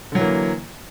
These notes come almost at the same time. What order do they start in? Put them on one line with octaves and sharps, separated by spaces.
D3 F#3 E3 A#3